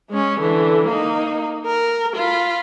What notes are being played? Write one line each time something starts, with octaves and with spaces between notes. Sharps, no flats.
G#3 C#4
D3 E3
A#3 D#4
A#4
F4 B5